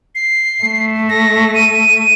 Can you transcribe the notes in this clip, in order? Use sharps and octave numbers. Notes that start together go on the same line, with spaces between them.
C7
A3
A#6
D#7